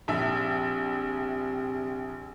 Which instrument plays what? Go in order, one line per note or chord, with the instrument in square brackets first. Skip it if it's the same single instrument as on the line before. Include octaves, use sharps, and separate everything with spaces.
[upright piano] A#1 E5 [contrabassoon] C3